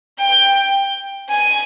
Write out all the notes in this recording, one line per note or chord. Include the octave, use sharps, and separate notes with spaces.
G5
G#5